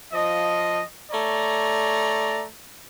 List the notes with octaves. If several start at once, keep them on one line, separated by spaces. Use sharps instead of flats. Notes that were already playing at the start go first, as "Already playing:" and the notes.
F3 D#5
A3 C#5 D5 A#5